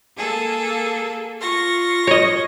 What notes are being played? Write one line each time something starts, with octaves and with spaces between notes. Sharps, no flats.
A#3 G#4 A4
F4 C#6 A#6
C#5 D#5